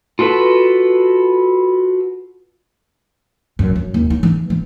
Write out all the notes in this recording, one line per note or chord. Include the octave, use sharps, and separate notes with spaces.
F4 F#4 A4 B4
F#2
F#2
D#2
D#4
E3
E3